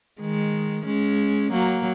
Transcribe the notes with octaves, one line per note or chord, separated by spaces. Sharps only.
D#3 G#3
G#3 C#4
F#3 A#3